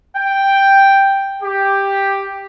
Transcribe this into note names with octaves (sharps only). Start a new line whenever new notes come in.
G5
G4